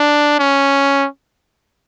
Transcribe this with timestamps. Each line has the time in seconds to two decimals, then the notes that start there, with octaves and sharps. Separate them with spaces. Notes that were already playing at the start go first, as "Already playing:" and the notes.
Already playing: D4
0.39 C#4